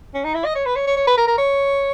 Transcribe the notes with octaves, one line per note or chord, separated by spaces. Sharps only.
C#4
D#4
E4
D#5
C#5
B4
C#5
C#5
C#5
B4
A#4
A#4
C#5